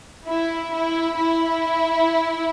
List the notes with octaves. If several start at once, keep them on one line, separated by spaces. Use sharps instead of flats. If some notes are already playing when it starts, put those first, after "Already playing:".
E4
E4
E4